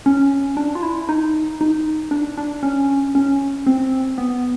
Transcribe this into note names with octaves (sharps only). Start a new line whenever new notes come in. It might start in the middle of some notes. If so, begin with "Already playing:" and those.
C#4
D4
F4
E4
D#4
D#4
D4
D4
C#4
C#4
C4
B3